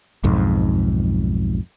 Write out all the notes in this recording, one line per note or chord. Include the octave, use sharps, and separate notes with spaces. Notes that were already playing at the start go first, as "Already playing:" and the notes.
B1 F2 G#2